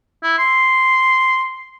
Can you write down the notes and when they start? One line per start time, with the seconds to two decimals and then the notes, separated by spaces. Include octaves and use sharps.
0.23 E4
0.38 C6